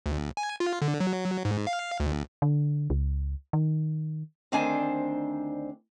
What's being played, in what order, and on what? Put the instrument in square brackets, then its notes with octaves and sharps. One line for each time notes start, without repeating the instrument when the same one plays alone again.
[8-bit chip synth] D2
G#5
F4
D3
F#3
G#2
F5
D2
[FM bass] D3
C#2
D#3
[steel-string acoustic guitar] D2 D#3 C4 D4 C5 G#5